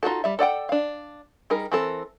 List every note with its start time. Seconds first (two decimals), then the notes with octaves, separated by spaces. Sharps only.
0.03 D#4 F4 F#4 A4
0.24 G3 E5
0.39 A4 D5 F#5 G5
0.69 D4 F5
1.50 G3 D#4 G#4 A#4
1.72 E3 C4 A4 A#4